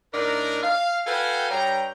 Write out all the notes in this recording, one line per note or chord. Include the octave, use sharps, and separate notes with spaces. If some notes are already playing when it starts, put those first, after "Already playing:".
A2 D4 D#4 A#4
F5
F#4 A4 B4 F5 G5 G#5
G2 G3 C#5 G5 A#5